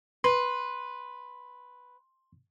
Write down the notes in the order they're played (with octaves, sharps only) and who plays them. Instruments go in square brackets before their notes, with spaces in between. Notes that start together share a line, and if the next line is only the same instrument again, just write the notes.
[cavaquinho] B4 [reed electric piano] C6